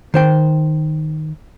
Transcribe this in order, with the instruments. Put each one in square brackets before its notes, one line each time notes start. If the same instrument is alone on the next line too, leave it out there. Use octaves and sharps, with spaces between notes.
[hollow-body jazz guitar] D#3 C5 G5